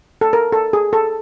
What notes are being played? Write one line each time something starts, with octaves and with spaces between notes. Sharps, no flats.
A4
A#4
A4
G#4
A4